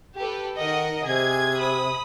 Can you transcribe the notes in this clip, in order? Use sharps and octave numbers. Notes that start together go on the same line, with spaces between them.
G4 A4 B4
D#3 A#4 D#5 F#5
C3 G#4 G#6
B5 D#6